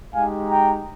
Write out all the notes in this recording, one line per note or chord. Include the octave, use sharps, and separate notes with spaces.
G#3 D#4 G4 F5 G#5
G5 A#5